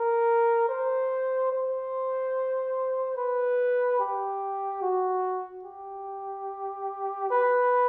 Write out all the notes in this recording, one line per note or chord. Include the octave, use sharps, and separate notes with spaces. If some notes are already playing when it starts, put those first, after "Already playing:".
Already playing: A#4
C5
C5
B4
G4
F#4
G4
B4